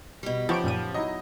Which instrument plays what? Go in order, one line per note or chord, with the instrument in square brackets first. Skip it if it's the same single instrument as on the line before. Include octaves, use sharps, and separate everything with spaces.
[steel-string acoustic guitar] B2 G3
[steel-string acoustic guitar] C#3 [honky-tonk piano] F3 [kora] B3 D#4 G4 [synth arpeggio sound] D#5 C#6 D7
[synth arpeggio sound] F#2 A#2 D#7
[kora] F#3 D#4 E4 [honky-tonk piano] D#5